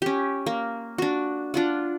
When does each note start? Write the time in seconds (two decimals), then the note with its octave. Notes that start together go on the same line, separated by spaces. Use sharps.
0.02 C#4 G4
0.46 A#3
0.98 D4 F#4
1.54 D4 F4 F#5